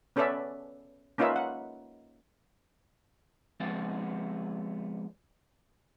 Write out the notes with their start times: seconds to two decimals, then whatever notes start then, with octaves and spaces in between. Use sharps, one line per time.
0.16 B3 C#4 A4 B4 D5 E5
1.18 A#3 C#4 D#4 F4 B4 E5
1.36 F#5
3.60 F3 G#3 B3 C4 F4